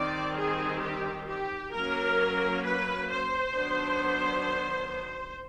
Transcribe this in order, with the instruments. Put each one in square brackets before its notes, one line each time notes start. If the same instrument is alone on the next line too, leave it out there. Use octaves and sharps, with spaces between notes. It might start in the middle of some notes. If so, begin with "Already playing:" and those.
Already playing: [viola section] D#3 G3 C4 D5
G#4
G4
G4
F#3 A#3 C#4 A#4
B4
C5
D#3 F#3 B3 D4